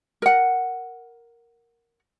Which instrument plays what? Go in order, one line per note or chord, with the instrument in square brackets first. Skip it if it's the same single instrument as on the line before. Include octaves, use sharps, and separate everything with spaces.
[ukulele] A#4 F#5